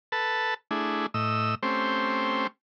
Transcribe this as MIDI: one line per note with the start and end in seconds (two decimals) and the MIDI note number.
0.12 0.54 69
0.12 0.54 71
0.12 0.54 81
0.71 1.06 57
0.71 1.06 62
0.71 1.06 64
0.71 1.06 68
1.14 1.55 45
1.14 1.55 75
1.14 1.55 88
1.63 2.47 57
1.63 2.47 60
1.63 2.47 61
1.63 2.47 67
1.63 2.47 72